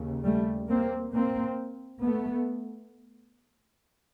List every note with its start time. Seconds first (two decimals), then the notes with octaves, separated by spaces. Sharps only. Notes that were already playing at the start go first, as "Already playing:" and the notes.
Already playing: D#2 C#3
0.24 G3 A3
0.69 A#3 C4
1.13 A#3 C4
2.02 A3 B3